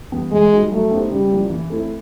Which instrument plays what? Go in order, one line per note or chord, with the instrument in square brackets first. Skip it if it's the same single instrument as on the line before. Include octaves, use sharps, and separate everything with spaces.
[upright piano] E3 G3 B3
[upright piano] E3 [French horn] G#3
[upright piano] G3 A#3 D#4 F#4
[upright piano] F#3 [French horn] A3
[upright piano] B3 D#4 G4 C5
[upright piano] C#3 [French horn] G3
[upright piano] F3 A#3 C#4 E4
E3
A3 C4 E4